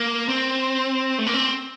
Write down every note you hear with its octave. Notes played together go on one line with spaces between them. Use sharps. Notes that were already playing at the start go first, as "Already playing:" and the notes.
Already playing: A#3
C4
A3
A#3
C4